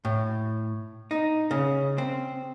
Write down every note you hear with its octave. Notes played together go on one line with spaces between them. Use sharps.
A2
D#4
C#3
C4